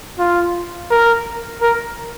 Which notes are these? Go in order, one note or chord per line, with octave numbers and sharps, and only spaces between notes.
F4
A#4
A#4